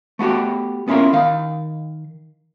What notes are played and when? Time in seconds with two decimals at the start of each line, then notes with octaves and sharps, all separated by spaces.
0.19 A3 B3 F#4 G4
0.88 B3 C#4 E4 F4 A#4
1.13 D#3 F5